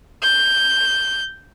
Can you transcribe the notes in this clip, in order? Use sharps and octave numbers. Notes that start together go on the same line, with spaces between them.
G6